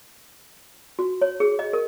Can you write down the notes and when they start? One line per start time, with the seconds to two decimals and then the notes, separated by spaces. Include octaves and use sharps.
0.99 F#4
1.22 C#5
1.40 G#4
1.59 D#5
1.73 A#4